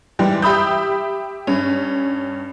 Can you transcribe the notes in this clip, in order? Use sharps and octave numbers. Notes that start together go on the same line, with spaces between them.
G#2 E3 G3 G#3
G4 E5 B5 D#6 G6
G2 C#4